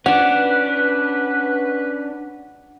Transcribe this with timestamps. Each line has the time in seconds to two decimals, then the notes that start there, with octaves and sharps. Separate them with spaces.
0.06 C#4 D4 B4 F#5